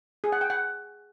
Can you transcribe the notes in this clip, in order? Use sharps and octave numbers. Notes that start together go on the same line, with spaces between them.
G#4
F#5
G5
F#5